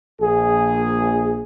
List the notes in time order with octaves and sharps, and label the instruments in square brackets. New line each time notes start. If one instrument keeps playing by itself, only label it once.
[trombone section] A#1 G#4